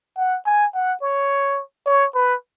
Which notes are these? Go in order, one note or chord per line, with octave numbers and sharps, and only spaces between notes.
F#5
G#5
F#5
C#5
C#5
B4